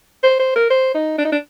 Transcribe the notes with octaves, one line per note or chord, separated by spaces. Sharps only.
C5
C5
A#4
C5
D#4
D4
D#4
D4